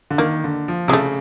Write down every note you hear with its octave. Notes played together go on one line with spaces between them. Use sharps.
D3
D#3 A#3
D3
F3
C3 G#3
C#3 A3